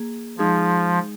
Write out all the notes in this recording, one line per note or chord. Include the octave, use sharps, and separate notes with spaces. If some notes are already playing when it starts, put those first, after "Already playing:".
Already playing: A#3 G#4
F3 G#3 D#4 G#4